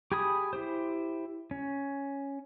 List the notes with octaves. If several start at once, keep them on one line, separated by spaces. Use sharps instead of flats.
G4 G#4 G#5 B5 D#6
E4 G4 C5
C#4